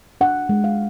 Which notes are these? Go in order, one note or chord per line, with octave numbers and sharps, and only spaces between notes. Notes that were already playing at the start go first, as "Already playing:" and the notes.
D4 F#5
G#3
F5